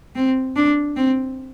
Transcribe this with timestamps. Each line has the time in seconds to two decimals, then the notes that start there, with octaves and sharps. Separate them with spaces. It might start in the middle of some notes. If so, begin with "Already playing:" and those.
0.16 C4
0.56 D4
0.96 C4